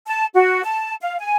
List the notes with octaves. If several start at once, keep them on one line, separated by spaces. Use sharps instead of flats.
A5
F#4
A5
F5
G#5